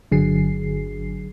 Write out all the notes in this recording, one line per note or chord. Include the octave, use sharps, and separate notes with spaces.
G1 D3 F#3 G#4 C7